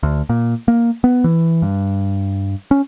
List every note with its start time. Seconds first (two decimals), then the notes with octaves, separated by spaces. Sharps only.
0.03 D2
0.29 A#2
0.68 A#3
1.04 B3
1.24 E3
1.62 G2
2.71 C#4